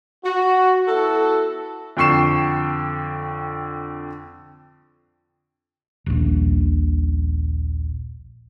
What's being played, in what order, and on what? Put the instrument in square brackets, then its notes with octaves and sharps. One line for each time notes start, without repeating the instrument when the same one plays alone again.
[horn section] F#4
B3 E4 F#4 A4
[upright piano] F2 D3 G5 C#6 C7 E7
[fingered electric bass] D#1 A#1